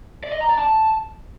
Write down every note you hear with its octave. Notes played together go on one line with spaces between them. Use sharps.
D5
D#5
A#5
D5
A5